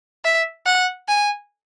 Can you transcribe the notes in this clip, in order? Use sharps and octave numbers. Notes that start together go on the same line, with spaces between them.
E5
F#5
G#5